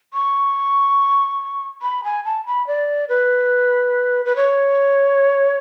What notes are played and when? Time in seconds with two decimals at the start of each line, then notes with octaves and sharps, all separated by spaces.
0.14 C#6
1.82 B5
2.04 G#5
2.25 A5
2.46 B5
2.67 D5
3.09 B4
4.25 B4
4.36 C#5